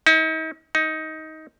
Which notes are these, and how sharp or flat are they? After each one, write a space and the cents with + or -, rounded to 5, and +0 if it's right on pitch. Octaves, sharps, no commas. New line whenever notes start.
D#4 +40
D#4 +15